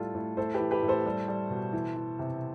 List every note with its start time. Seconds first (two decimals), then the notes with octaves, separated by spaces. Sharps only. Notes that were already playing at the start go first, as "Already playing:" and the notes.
Already playing: A2 G3 F4 A4
0.15 A2
0.37 A2 A4 C5
0.54 G4 B4
0.60 E3
0.71 G4 B4
0.83 A2
0.88 A4 C5
1.06 G3
1.28 G3
1.50 B2
1.73 E3
1.96 E3
2.19 C3